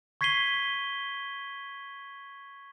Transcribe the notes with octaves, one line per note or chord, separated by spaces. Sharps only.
C#6 G#6 B6 C7 D#7 G7